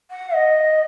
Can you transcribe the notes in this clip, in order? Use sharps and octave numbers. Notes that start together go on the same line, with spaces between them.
F#5
D#5